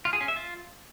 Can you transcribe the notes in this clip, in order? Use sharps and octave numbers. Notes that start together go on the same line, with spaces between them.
F4
G#4
C#4
E5
F4